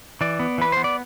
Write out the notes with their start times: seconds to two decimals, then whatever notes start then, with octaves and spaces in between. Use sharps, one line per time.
0.21 E3 D5
0.39 B3
0.58 E3 B4
0.72 B3 C5
0.84 D5